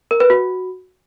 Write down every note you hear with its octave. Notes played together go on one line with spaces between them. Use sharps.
A#4
B4
F#4